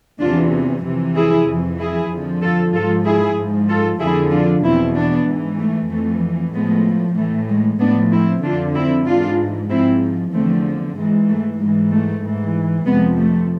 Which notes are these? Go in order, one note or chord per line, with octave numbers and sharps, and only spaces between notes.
E2 C3 E3 D4 F4
F2 C3 E3
E4 G#4
F2 E3
E4 G#4
F2 D3 F3
F4 A4
G#2 F3 F4 A4
E4 G#4
G#2 F3
F4 A4
F2 D3 F3 E4 G#4
D4 F4
E2 B2 C4 E4
B3 D4
G#2 E3
A3
F2 E3 A3
A2 F3 G#3 B3
A2 E3 A3
G#3
A2 F3 B3 D4
C4 E4
F2 D3 F3 D4 F4
C4 E4
G#2 E3 D4 F4
G#2 F3 C4 E4
E2 D3 F3 A3 C4
G#2 E3 G#3
A3
G#2 E3 G#3
A3
G#2 E3
F2 C3 F3 G#3 B3
A3